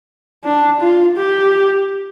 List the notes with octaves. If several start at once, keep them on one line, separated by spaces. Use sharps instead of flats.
D4
F4
G4